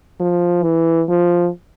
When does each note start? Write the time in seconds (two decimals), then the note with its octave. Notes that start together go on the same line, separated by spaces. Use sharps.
0.20 F3
0.63 E3
1.09 F3